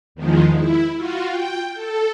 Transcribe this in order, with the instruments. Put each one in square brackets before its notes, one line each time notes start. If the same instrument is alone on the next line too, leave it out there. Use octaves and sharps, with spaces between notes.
[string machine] E2 D#3 F3 G#3
E4
F4 F#4
G5
A4